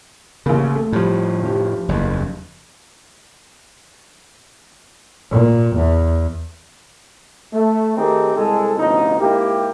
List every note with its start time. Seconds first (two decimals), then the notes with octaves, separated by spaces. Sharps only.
0.46 A1 C#3 A#3
0.75 A3
0.93 A2 F3 G3
1.43 F1 G4
1.89 F#1 E2
5.31 A#2
5.75 E2
7.53 A3
7.97 D#3 A3 C4 D#4 G4 G#4
8.36 C2 G#3 A4
8.77 A1 D2 B2 F3 D#4
9.19 G#2 A#3 E4 G4